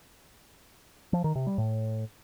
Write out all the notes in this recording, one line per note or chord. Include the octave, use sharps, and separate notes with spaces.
F3
D#3
C3
G3
A2